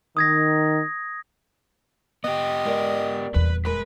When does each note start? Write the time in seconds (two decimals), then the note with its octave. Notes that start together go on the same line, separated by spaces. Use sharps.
0.17 D#3 D#6 G#6 A#6
2.24 B3 G4 D#5
2.65 G#3 A#4 D5
3.34 D#1 E2 B4
3.65 G#3 A#4 B4 B5